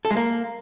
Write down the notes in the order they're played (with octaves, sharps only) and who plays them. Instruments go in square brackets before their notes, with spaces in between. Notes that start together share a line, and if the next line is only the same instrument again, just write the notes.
[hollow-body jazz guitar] A4
G#3
A#3